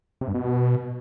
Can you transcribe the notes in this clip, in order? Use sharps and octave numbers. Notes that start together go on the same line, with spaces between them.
C3
G2
B2